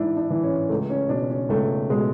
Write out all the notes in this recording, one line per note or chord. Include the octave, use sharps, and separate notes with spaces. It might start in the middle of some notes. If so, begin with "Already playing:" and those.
Already playing: G#2 E3 D4 E4
D4
E3
C#4
C#2 A3
C#4
B2 D4
C#4
C#2 A3
B2 G#3